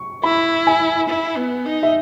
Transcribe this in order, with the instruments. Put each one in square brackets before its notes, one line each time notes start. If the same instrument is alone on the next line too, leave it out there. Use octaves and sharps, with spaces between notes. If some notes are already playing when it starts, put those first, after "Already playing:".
Already playing: [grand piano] C#6
[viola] E4 [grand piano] B5
[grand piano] G#5
[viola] E4
B3
D#4
[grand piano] E5